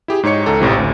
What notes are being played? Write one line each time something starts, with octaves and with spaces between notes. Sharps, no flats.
E4 G4 G#4
G#2 D#4 C#5 C#7
C#2 A4 A#5
A1 A2 C3 E3
D2